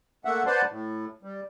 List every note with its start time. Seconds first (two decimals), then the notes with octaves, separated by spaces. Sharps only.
0.25 A3 A#3 E5 F#5
0.46 B4 C5 D5 F#5 A5 C6
0.70 A2
1.23 G3